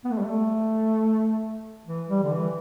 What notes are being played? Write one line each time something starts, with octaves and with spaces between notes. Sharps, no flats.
B3
A3
G3
A3
E3
G3
D3
E3